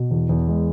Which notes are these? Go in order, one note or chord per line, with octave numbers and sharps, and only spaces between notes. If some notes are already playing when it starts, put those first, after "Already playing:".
Already playing: B2
E2
E2
G#3